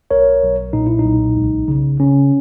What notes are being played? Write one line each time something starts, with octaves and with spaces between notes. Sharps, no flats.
B1 A#4 C#5
B1
A#2 D#4
E4
D#4
B1
C#2
C#3
C#3 C#4